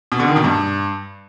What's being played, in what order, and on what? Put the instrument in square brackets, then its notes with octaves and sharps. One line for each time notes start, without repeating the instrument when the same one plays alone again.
[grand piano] B2
D3
D#3
B2
G2